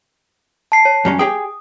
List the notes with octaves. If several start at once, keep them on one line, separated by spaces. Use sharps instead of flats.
A5 C7
C#5
F#2 G3 C#4
G4 G#4 G5 D#6